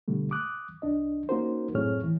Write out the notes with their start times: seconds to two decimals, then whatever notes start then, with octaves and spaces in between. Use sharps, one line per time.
0.08 B2 D3 G3 A3
0.31 D6 D#6 F#6
0.82 C2 D4 D#5
1.29 A#3 C#4 D#4 F#4 A#4 C5
1.75 F#2 A2 C4 G#4 C#5 F6
2.04 E3